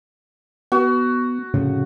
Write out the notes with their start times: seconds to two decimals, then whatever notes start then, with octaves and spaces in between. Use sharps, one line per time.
0.72 B3 F#4
1.54 F1 A2 C#3